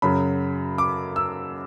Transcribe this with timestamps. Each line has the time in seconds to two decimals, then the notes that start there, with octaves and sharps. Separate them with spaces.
0.02 F#2 C#3 F#3 B5
0.78 D6
1.16 E6